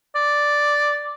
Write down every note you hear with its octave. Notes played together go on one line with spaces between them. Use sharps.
D5